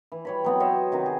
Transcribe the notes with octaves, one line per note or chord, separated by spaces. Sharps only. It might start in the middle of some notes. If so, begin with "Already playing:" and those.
E3
G3 C#5 B5
F#3 B3 C4
C5 C#5 D#5 E5
C3 D#3 F#4
G#4